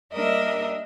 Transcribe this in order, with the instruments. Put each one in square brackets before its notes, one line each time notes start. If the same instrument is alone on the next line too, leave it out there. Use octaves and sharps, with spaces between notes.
[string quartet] G3 A#3 D4 A#4 D#5 E5